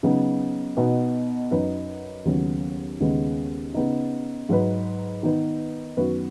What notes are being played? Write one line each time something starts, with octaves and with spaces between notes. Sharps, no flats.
C#3 F#3 B3 D#4
B2 B3 D#4
F#2 F#3 D#4 B4
D#2 C#3 F#3 B3
D#2 C#3 G#3 B3
C#3 B3 D#4
G#2 F#3 D#4 B4
D#3 B3 D#4 B4
F#2 D#3 B3 F#4 B4